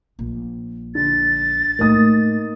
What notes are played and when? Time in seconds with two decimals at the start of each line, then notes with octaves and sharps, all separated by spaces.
0.19 A#1
0.95 D3 A6
1.79 A2 G#3 A#3 D#4 D#6